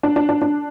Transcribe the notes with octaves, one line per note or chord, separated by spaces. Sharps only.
D4
D4
D4
D4